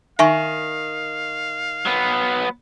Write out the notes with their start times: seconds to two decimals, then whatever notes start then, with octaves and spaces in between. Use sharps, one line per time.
0.19 D#3 E5 F5 G#5 C#6
1.86 F#3 B3